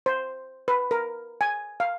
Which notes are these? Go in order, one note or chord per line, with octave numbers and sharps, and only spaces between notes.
C5
B4
A#4
G#5
F5